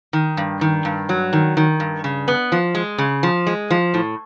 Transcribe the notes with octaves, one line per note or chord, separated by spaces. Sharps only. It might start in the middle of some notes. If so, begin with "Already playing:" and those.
D#3
G2
D#3
G2
F#3
D#3
D#3
G2
C#3
B3
F3
G#3
C#3
F3
G#3
F3
A2